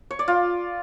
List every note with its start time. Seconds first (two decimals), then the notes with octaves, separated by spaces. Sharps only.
0.11 C#5
0.19 D5
0.28 F4